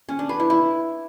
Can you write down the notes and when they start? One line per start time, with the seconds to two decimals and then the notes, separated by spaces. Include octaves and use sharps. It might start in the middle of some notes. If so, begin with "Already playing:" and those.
0.09 C#4
0.19 D4
0.29 B4
0.40 E4
0.50 E4